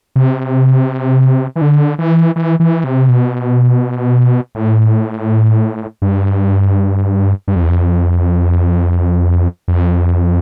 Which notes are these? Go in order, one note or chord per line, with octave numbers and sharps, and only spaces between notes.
C3
E3
D3
E3
E3
E3
C3
B2
A2
G2
G2
F2
E2
F2
F2